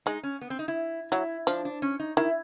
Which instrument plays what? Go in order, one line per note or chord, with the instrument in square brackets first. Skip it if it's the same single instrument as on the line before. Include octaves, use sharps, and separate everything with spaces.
[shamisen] G#3 [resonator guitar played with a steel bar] D#4
[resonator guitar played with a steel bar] C#4
B3
C4
D#4
E4
[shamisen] F#3 [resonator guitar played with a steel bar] E4
[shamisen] F3 [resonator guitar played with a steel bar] D4
[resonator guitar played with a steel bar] D4
C#4
D#4
[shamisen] D#3 [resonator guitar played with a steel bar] E4